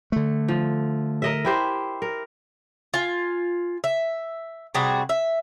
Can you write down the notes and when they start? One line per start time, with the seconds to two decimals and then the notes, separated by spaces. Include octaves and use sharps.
0.12 D3 A3
0.48 F3
1.22 A#4 D#5 E5
1.45 E4 G4 C5
2.02 A#4
2.94 F4 G#5
3.84 E5
4.75 C3 G3 F#4 G#4
5.09 E5